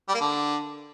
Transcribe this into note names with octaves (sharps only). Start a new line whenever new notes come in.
G3
A#3
D3